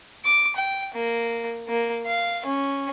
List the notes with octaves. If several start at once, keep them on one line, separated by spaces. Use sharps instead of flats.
D6
G5
A#3
A#3
F5
C#4